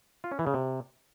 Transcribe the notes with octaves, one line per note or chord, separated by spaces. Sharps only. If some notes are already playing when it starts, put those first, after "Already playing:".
F4
C#4
E3
C#3
C3